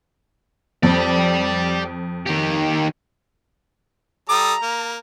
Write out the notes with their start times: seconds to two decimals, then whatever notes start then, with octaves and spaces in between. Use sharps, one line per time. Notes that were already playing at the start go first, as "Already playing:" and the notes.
0.83 F2 G4 D5
2.27 D#3 G4
4.29 G3 A4 A#5 D#6
4.62 A#3